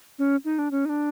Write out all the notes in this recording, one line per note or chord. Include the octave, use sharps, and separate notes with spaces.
C#4
D#4
D4
C#4
D#4
D4